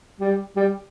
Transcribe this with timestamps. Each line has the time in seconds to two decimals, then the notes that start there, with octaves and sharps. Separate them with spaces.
0.20 G3
0.56 G3